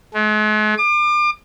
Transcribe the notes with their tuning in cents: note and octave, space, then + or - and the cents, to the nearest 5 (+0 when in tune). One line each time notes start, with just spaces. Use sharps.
G#3 +45
D6 +35